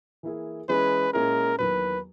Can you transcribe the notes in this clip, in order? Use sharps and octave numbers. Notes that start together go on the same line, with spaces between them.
E3 A#3 E4 G#4
E3 G#3 C#4 G#4 B4
A#2 G#3 C#4 E4 G#4 A#4
E2 D#3 F#3 A#3 B4